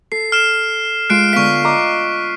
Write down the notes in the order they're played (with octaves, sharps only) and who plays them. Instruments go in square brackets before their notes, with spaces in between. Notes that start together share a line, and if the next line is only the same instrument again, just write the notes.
[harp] A4 [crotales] C7
[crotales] F6 C7 E7
[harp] G#3 F4 [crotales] F#6 C7 D7
[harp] D3 B3 F5 [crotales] C#6 B6
[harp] D#5 A#5 D6